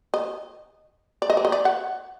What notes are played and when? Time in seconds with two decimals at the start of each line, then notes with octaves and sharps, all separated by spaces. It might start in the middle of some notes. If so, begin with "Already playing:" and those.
0.14 D#5
1.22 D5
1.30 D#5
1.37 D5
1.45 D#5
1.52 D5
1.65 F#5